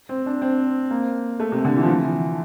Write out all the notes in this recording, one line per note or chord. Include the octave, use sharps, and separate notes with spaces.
C4
D4
C4
A#3
A3
C3
D3
E3
F3
E3